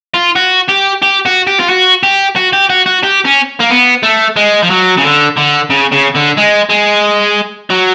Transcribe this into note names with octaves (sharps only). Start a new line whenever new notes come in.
F4
F#4
G4
G4
F#4
G4
F4
F#4
G4
F#4
G4
F#4
F#4
G4
C#4
A#3
B3
A3
G#3
F3
F#3
C#3
D3
D3
C#3
C#3
D3
G#3
G#3
F#3